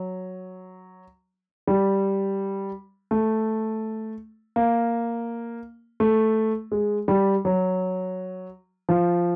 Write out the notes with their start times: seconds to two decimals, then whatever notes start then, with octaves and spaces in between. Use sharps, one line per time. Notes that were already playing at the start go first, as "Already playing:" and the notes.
Already playing: F#3
1.67 G3
3.11 A3
4.56 A#3
6.00 A3
6.72 G#3
7.08 G3
7.45 F#3
8.89 F3